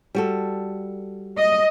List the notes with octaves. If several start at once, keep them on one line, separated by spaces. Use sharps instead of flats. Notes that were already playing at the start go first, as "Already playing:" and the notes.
G3 F#4 A4
D#5